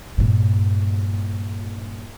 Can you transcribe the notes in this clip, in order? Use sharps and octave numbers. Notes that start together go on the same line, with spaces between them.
G2 A#2